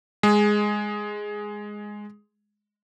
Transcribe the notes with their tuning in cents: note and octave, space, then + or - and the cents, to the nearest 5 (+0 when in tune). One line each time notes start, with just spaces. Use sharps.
G#3 +0 G#4 +5